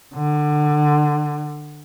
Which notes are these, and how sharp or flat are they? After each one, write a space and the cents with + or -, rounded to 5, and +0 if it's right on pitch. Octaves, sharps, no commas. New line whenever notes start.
D3 +25